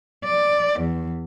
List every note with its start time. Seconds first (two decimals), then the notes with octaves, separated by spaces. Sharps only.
0.24 D5
0.80 E2